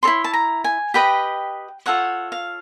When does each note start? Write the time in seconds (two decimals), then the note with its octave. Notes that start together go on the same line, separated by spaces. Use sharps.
0.03 E4 A4 C#5 C6
0.24 A5
0.33 A#5
0.64 G#5
0.94 G4 B4 D#5 G5
1.86 F4 A4 C#5 F#5
2.32 F5